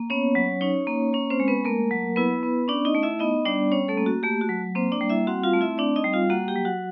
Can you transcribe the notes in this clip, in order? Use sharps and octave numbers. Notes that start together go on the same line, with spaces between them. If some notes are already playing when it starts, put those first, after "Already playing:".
Already playing: A#3
B3 C#4 C#5
F#3
C#4 D#4 C#5
A#3
C#4 C#5
C4 C5
G#3
B3 B4
A3 A#3 A#4
F#3
B3 E4 B4
B3
C#4 D4 D5
D#4 D#5
A3
E4 E5
B3 D#4 D#5
G3 D4 D5
C#4 C#5
A3 A4
A#3
F#4
A3 G4
F#4
F#3
A#3 C4 C5
D4 D5
G3
E4 E5
C4 F#4 F#5
F4 F5
A3
E4 E5
C4 D4 D5
D#4 D#5
G3
F4 F5
A#3 F#4 F#5
G4 G5
F#3
F#4 F#5